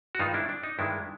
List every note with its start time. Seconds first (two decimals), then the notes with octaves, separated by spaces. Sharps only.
0.15 F#4
0.19 G2 D#3 G#3 D#4 F4
0.34 D4 E4
0.49 D4
0.64 D#4
0.79 G2 D#3 G#3 D4 E4